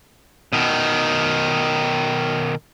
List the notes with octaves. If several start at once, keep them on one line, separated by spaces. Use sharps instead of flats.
B2 D#3